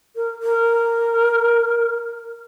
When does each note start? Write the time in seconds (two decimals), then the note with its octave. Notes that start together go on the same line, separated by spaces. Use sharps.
0.16 A#4
0.43 A#4